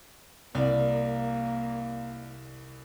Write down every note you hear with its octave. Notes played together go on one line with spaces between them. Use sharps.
C2 A#3 D5 F5